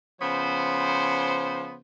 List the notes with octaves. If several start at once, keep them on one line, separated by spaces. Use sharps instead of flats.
C#3 F3 B3 C5